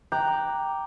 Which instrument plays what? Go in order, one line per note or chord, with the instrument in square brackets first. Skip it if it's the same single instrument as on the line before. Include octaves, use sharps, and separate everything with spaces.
[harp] G5 A#5 D6 F#6 G6